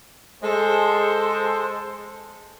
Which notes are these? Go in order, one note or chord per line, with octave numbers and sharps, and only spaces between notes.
G#3 A4 C5